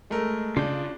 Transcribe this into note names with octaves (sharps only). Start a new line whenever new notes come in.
G#3 A3 A#4
C#3 D4 F4 G6